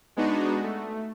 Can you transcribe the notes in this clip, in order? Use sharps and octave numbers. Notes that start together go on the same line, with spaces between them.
G#3 B3 D4 D#4 F#4
A3